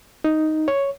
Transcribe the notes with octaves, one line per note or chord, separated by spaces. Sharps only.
D#4
C#5